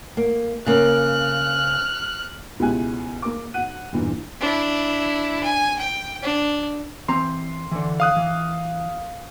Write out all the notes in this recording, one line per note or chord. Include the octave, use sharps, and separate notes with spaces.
A#3
C#3 A#3 F6 F#6
C#2 B2 E4 G4 G#5 F#6
A#3 D6
F#5 F#6 D#7
E1 G2 A#2 E3
D4 E4
G#5
G5
D4
E3 C4 A#5 C6
D3 E3
F5 D#6 F#6
E3